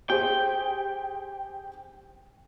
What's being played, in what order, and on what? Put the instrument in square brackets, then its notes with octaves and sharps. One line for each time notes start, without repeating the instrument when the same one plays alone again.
[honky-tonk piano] G4 G#4 C5 [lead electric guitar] G5